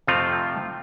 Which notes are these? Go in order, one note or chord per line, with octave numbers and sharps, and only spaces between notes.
F2 C3 F3 A3 C4 F4